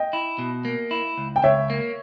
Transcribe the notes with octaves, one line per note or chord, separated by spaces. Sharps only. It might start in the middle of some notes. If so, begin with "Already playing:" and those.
Already playing: D#5 G5
E4
B2
A#3
E4
C#2
G5
C#2 C#5 E5
A#3